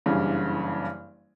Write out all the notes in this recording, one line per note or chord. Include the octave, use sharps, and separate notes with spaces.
F#1 G2 C#3 E3